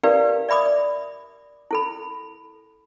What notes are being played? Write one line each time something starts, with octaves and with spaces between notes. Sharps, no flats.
E4 G4 A#4 B4 D5 F5
D5 E5 B5 D6 D#6
D5
E4 A4 B5